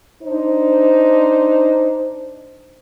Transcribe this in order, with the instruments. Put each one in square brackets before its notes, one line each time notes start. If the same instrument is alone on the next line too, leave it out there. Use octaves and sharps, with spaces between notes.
[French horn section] D4 D#4 C5